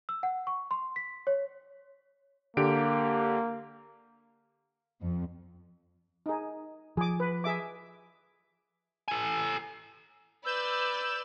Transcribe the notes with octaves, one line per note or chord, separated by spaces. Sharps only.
E6
F#5
C#6
C6
B6
C#5
D3 A#3 G4 D7
F2
D#4 G#4
F3 G#4 D6
B4
G#4 E5 D6
A4 G#5
B4 D5 E6 G6 E7